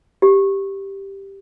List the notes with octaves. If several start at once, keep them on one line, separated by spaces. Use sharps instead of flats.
G4